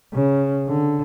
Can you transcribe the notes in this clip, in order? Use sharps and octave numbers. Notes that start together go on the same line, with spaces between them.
C#3
D3